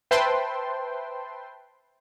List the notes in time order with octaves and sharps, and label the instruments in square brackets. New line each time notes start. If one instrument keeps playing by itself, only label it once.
[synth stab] B4 C5 E5 G5 A5 C6